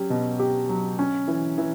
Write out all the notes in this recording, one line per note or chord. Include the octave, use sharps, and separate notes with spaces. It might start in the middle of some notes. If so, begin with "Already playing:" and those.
Already playing: F#3 C#4 G4
B2
G4
F#3
C#4
E3
E3